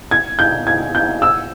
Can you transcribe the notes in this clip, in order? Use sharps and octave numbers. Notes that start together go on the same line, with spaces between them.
G#6
G6
G#6
G6
E6